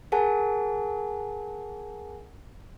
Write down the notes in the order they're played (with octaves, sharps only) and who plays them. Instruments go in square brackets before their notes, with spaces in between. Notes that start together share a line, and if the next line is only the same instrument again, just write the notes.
[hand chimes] G#4 A#4 F#5 G#5 A5